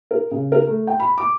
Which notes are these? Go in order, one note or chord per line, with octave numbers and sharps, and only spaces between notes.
A#4
C#3
A#4
A3
G5
B5
D6